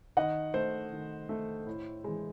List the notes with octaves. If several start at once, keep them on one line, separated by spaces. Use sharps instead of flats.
D#3 D#5 F#5
A3 C5
D#3
A3
A2
E3 G#3